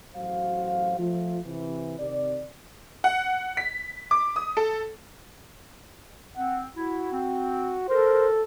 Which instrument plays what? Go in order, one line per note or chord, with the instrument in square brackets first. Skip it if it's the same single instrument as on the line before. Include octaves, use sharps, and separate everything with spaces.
[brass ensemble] A1 F#3 F#4 C5 F5
F3 A3 F4
C3 E3
C3 D#3 D5
[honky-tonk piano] F#5
B6
D6
D#6
A4
[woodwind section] C4 [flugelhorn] F#5
[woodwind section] E4 [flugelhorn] F#4
[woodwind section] C4
[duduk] A4 [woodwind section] A#4 [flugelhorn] C5